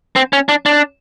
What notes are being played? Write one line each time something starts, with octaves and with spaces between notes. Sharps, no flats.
C4
C#4
D4
D4